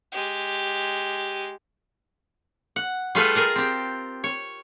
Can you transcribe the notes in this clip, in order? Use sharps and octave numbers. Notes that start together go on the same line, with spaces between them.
G#3 G4
F#5
G3 A3 F4 G#4 A4 B4
G#4 A#4 D5
C4 G4
C#5